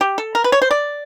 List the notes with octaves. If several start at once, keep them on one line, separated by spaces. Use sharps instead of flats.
G4
A4
A#4
B4
C#5
C5
D5